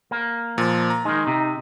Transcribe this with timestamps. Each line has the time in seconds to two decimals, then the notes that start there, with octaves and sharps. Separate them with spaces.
0.11 A#3
0.58 A#2 F3
0.90 A#5
1.05 D#3 G#3 D#4
1.27 C3